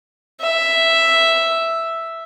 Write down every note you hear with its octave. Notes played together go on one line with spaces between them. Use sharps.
E5